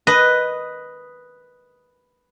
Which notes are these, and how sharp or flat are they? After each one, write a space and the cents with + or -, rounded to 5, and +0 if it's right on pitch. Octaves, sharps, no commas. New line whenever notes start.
B4 +0 D#5 +0